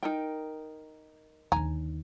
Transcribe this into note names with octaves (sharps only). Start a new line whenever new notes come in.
D#4 A#4 G5
D#2 D3 G#5 A#5